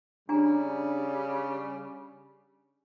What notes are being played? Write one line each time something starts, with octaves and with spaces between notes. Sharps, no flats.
C#3 G3 D4 G#5 A#5